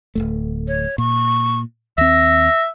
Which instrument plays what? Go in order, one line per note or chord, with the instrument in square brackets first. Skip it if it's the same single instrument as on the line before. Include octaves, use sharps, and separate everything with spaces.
[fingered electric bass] D1 E2 A3
[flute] C#5
[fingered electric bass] A#2 [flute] C#6
[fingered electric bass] D#2 C4 [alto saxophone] E5 [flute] A#6